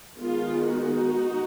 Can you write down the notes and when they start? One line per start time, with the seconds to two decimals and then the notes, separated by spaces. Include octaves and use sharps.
0.19 D#3 G#3 B3 F4
0.69 D#4 F#4